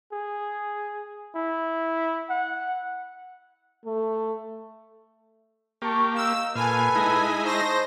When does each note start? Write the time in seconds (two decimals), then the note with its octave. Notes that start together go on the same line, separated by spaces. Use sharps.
0.13 G#4
1.36 E4
2.30 F#5
3.85 A3
5.82 A#3 G4 A5 C#6
6.16 D#4 F5 E6
6.55 A#2 A4 B4 F5 G#5
6.95 G#3 D#4 E4
7.44 C5 D#5 A5 C#6 A#6